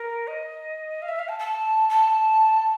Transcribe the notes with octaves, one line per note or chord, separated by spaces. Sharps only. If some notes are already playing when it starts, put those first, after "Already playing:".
Already playing: A#4
D#5
F5
E5
F5
A5
A5
A5